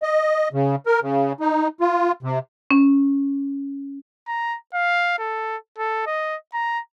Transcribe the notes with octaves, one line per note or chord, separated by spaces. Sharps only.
D#5
C#3
A#4
C#3
D#4
F4
C3
C#4
A#5
F5
A4
A4
D#5
A#5